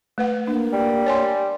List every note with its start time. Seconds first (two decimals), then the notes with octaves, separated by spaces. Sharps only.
0.18 A3 B4 F#5
0.47 A#3 D4
0.73 G3
1.06 C#5 G#5 C6